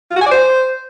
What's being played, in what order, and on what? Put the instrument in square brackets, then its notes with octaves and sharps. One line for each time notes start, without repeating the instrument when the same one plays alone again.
[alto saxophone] F4
F#4
G#5
D5
C5